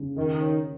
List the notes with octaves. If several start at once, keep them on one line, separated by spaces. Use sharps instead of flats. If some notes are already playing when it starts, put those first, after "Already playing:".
Already playing: C#3
D#3 A#4
C#5